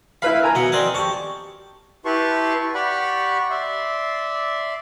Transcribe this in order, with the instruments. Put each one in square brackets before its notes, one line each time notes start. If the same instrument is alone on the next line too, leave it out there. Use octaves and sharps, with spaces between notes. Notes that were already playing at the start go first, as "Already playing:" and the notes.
[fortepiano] E4 B4 F5 [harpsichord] B5
[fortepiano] A#4 G#5 A#5
[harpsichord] B2 F#5
C4 D5 D#5
[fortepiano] G4 C#6 [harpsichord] A5
[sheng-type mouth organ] E4 G4 B4 A5 C6 C#6
G4 D5 F#5 B5 C#6
D5 E5 C6